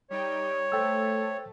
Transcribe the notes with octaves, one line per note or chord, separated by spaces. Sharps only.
G3 D#4 C#5 G5
A3 A4 C5 G5 E6